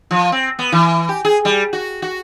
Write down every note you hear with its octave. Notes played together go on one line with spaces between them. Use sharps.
F3
C4
B3
E3
G4
G#4
G3
F#4
F#4